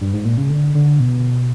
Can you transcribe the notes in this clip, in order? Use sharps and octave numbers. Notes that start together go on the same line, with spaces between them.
G2
G#2
A#2
C#3
D3
D3
B2